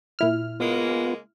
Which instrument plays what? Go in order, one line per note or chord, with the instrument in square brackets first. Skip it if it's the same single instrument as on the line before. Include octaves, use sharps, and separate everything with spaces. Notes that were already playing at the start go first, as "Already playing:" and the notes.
[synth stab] A#2 E4 F6
[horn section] C#3 G#3 A#3 [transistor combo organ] B3 F4